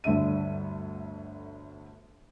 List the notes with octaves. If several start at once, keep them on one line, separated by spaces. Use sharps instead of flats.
G1 D2 D3 E5 D#7